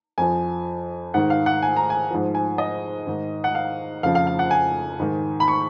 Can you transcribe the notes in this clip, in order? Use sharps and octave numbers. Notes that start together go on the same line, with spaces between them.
F2 F3 G#5
G#2 D#3 F#5
F5
F#5
G#5
A#5
G#5
G#2 F3
G#5
D#5
G#2 D#3
F#5
F5
F2 C#3 F3 F5
F5
F5
F#5
G#5
G#2 D#3
B5
C#6